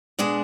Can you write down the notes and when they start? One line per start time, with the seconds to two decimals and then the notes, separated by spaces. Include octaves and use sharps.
0.19 B2 G#3 D4 G#4